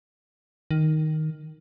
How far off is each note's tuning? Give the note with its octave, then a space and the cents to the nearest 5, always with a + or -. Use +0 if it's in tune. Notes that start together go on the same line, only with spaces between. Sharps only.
D#3 +0